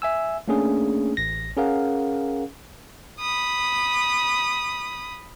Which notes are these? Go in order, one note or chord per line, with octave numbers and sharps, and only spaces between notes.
E5 G#5 E6
A3 A#3 C#4 D4 G#4
A1 A#6
C#4 G#4 A#4 F5 F#5
B5 D#6